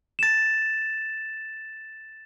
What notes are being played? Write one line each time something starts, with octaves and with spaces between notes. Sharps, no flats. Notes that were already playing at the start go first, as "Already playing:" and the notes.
A6 E7